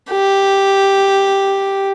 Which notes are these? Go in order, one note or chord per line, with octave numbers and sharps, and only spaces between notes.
G4